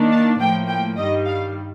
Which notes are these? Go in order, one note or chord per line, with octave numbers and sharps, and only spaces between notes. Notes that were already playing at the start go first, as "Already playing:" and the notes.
Already playing: D#3 A#3 D4
A5
A2 F3 A#3 G5
G5
G2 D#3 G3 D#5
F5